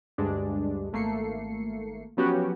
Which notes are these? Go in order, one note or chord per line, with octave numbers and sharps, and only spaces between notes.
D2 G2 G#3 D4
G#1 A3 A#3 C7 C#7
F3 F#3 B3 C#4 F#4 G4